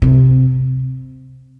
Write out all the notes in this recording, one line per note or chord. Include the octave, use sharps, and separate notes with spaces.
C3